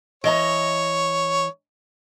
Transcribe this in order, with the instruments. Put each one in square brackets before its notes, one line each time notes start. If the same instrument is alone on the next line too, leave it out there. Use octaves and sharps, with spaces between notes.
[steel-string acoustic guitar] E3 D#5 A#5 [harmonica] C#5